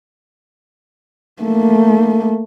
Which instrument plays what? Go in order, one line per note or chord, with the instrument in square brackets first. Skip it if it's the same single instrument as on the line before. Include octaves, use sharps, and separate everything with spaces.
[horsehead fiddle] A3 A#3